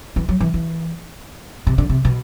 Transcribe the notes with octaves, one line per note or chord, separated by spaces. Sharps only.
E3
F#3
E3
E3
C3
D3
C3
B2